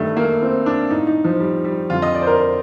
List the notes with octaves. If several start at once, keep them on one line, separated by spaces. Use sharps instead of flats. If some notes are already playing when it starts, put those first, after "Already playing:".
Already playing: G2 D#3 A3
A#3
C4
D4
A2 D#4
D#4
F3
G3
G3
F2 D3 F4
D#5
D5
C5
A#4
C5